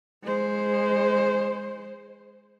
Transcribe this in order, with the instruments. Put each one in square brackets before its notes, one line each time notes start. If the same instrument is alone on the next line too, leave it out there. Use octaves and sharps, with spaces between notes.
[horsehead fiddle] G#3 C5